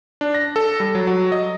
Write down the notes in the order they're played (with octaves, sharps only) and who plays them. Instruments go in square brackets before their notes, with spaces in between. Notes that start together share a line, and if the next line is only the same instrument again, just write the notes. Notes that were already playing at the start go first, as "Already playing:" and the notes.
[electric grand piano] D4
A#6
A4
G3
F#3
F#3
D#5